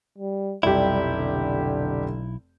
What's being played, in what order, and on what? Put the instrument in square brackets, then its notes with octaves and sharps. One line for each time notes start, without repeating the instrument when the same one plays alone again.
[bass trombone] G3
[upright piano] F1 G4 [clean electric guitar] B1 E4 [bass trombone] G3
[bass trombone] D3